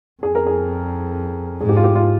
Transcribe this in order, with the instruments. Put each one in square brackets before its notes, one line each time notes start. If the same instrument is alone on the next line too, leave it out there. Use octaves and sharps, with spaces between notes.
[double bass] F2 [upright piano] G#4
[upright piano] A#4
G#4
[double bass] G#2 [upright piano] G#4
[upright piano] G4
F4
G4
F4